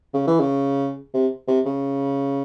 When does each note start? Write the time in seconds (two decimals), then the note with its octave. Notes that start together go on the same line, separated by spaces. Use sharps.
0.14 C#3
0.27 E3
0.40 C#3
1.14 C3
1.48 C3
1.66 C#3